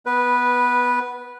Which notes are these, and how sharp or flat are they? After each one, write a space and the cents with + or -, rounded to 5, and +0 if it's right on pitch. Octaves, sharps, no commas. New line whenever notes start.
B3 +0 B4 -10